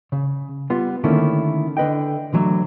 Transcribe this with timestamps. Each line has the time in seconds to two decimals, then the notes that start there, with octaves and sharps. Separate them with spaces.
0.12 C#3
0.70 G3 B3 F4 C6
1.04 D3 D#3 A3 A#3 C#4 E4
1.77 D3 B4 D#5 G5
2.33 D3 E3 F#3 A3